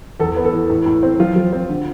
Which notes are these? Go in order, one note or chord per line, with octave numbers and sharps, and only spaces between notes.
E2 A4
B3
A4
E3
A2
A2
C4
F3 F4
F3
C4
D3